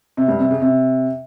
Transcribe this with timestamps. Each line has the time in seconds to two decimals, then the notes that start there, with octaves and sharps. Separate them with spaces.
0.17 C3
0.28 G2
0.40 C3
0.51 C#3
0.62 C3